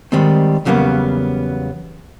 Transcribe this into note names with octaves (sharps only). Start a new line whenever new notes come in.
D#3 G3 G#3 C4
E2 C#3 F#3 G3 A#3 B3